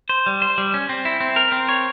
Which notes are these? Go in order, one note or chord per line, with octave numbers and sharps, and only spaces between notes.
C5
G3
C5
G3
C#4
C4
E4
C4
A#4
C4
C#5